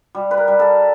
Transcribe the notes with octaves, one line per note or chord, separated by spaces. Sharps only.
G3
B4
A#4
G3
A4